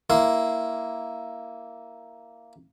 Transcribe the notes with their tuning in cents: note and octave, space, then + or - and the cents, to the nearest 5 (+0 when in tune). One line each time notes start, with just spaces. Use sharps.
A#3 +0 E4 +0 C6 +0